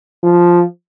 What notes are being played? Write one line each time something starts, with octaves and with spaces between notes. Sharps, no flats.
F3